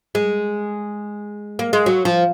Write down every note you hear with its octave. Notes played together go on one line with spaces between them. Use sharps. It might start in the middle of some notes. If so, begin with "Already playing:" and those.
G#3
A#3
G#3
F#3
F3